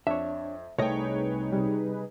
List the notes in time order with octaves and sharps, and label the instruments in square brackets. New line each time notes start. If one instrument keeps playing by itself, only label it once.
[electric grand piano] F2 [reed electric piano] D4 C#5 [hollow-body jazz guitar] E5
[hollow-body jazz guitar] C2 D#5 [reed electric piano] A3 [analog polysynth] D#4 G#4 B4 [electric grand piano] C#5 G5
[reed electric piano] C3 G3